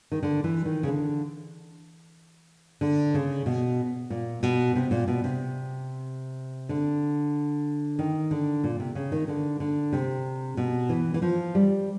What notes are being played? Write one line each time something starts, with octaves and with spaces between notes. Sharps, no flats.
D#3
D3
E3
D#3
C#3
D3
D3
C#3
B2
A#2
B2
C3
A#2
B2
C3
D3
D#3
D3
A#2
C3
C#3
D#3
D3
D3
C3
B2
E3
E3
F3
G3